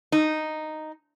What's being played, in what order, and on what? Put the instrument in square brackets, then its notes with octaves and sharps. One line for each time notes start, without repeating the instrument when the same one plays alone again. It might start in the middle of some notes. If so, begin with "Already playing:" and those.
[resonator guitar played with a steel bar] D#4